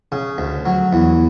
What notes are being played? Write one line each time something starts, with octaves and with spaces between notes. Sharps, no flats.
C#3
D2
F#3
E2